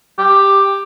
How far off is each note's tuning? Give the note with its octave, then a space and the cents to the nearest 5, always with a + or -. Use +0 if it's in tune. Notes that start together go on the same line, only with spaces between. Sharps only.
G4 +10